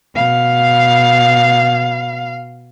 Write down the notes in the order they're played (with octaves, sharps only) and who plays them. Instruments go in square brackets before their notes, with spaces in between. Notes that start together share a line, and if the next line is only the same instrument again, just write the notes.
[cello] B2 F5